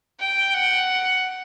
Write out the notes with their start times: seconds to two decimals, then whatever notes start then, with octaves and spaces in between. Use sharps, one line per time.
0.20 G5
0.54 F#5